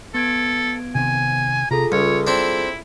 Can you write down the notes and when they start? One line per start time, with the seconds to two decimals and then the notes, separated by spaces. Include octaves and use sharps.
0.14 B3 A4 G#6 D7
0.95 C3 D#3 C4 G#5
1.71 C3 F4 G#4 A4 A#5
1.92 C#2 G3 C#5
2.27 C4 D4 E4